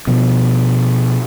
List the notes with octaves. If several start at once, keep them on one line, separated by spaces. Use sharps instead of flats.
B2 F3